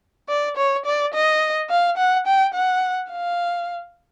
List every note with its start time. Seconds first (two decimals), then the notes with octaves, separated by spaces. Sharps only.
0.29 D5
0.57 C#5
0.86 D5
1.14 D#5
1.70 F5
1.97 F#5
2.27 G5
2.54 F#5
3.11 F5